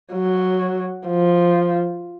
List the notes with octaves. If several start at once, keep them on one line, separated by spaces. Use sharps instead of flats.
F#3
F3